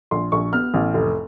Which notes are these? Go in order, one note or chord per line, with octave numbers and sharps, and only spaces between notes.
A#1 C6
A#1 C#6
B3 F6
A1
F1